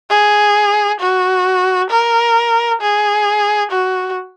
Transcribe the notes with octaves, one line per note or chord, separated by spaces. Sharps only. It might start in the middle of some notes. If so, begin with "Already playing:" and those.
G#4
F#4
A#4
G#4
F#4